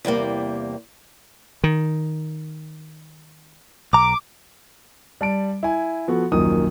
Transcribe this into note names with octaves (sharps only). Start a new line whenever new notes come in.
E2 C3 G3 A#3
D#3
B1 A#5 D6
G3 A5 D7
E4 G#5
F3 B3 F#4 A4
D#1 A#1 F#2 D#3 D#6